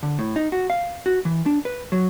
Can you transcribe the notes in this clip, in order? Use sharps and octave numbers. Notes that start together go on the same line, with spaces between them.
D3
A2
D#4
F#4
F5
F#4
E3
D4
B4
F#3